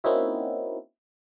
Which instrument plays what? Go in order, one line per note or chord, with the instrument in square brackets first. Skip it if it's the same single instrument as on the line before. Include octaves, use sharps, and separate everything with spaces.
[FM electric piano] A#3 C4 C#4 D#4 E4 F#4